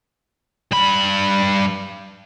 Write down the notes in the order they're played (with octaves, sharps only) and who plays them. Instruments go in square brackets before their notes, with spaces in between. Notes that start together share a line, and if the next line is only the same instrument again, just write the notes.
[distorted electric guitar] G2 B5